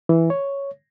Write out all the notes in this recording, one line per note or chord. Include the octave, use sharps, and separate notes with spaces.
E3
C#5